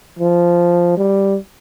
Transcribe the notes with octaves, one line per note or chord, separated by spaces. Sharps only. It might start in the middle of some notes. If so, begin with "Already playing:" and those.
F3
G3